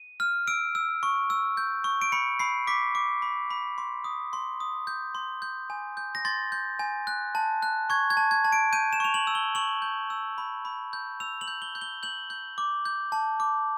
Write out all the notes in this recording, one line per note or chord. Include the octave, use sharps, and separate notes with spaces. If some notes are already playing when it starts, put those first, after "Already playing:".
Already playing: D#7
F6
E6 D7
E6
C#6
E6
G6
C#6
D7
B5 C#7
B5 C7
D6 B6
D6
B5
B5
C6
D#6
C6
D#6
G6
C6
G6
G#5
G6
A#6
C6 A6
G6
G#5
F#6
A5
F#6
C#6 G#6
G#6
A5
G#6
A5
D7
G6 D#7
E7
C#6 F7
F#7
E6
G7
C#6 F#7
G6
E6
B5
B5
G6
E6 F7
F#7
G6
G7
G6
G7
G6 F#7
G6
D6
G6
A5
D6